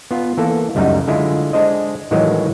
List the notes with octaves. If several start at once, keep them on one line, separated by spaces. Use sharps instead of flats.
B3 F4
E3 A#3 A4
C#2 F#2 G3 A3 D#4 F#5
D3 G#3 E4 F4
G#3 D4 C5 D#5
A2 D#3 E3 F#3 G#3